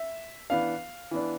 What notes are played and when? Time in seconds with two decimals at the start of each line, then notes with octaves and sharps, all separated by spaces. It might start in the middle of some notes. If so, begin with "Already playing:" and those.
Already playing: E5
0.50 E3 B3 D4 F5
1.11 E3 B3 D4